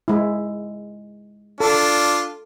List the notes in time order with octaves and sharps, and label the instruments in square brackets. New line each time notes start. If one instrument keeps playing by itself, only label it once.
[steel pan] G#3 E4
[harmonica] D4 F4 [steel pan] A4